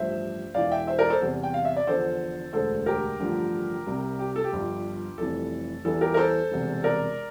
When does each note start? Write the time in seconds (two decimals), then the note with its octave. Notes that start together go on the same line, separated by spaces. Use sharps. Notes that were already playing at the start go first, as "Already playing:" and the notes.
Already playing: A1 G2 F3 C5 E5
0.54 E1 E2 E3 D5 F5
0.71 E5 G5
0.87 C5 E5
0.98 A#4 D5
1.10 A4 C5
1.21 E2 C3 G3
1.43 G5
1.54 F5
1.65 E5
1.77 D5
1.87 E2 D3 F3 A4 C5
2.53 E1 D2 D3 A4 C5
2.86 G4 A#4
3.19 A1 G2 D3 F3
3.86 C2 C3 G3
4.19 G4
4.36 A4
4.44 G4
4.52 G1 G2 F3
5.18 F1 F2 E3 G3 A4
5.84 E2 E3 G3 A4
6.01 G4 A#4
6.14 A#4
6.17 A4 C5
6.51 E1 E2 C3 G3
6.84 A#4 D5